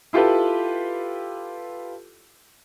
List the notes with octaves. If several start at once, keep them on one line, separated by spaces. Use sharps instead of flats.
E4 F4 G4 A4 B4